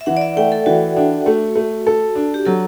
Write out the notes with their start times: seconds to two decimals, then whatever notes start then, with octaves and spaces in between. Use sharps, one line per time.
0.01 E5
0.06 E3 F#5
0.17 D5
0.21 E5
0.37 A3 G5
0.52 A4
0.66 E3 F#4
0.97 D4
1.26 A3
1.55 A3
1.87 A4
2.16 D4
2.34 G4
2.46 F#3 A4